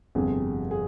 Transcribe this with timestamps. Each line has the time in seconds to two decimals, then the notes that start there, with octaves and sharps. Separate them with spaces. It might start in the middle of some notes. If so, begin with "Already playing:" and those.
0.15 G1 F2 C3 G#4
0.71 G#4